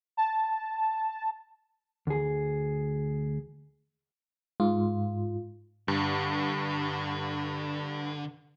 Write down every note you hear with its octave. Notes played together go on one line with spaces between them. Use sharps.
A5
D2 G#4
G#2 F4
G2 D3